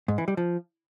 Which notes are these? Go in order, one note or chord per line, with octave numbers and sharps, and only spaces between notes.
G#2
E3
G3
F3